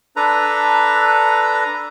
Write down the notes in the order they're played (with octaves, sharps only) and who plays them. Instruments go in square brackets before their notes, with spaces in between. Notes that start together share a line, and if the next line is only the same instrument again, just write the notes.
[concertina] D4 A4 B4 A#5